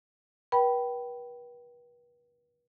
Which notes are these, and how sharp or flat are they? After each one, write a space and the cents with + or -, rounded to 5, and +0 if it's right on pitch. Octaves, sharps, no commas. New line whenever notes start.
B4 -40 G5 -20 B5 +0